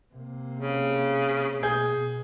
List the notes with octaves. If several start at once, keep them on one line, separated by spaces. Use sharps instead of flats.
C3 A#3
C#3
B2 G#4 G6